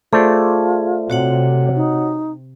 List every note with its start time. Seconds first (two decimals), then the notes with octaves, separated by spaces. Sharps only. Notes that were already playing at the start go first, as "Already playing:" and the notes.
0.13 A3 F4 G#4 C5 D5
1.10 C3 F#4 C#5 F#5
1.76 D#4